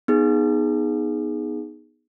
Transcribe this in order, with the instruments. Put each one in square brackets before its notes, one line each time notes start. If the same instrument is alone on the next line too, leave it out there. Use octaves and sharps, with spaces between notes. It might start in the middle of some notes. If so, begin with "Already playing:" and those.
[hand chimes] B3 D#4 G#4